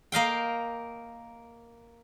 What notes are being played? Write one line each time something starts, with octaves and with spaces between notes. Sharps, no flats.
A#3 D#5 F5 G5